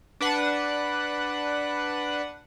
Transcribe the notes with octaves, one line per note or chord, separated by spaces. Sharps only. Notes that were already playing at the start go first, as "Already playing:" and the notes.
D4 B4 F#5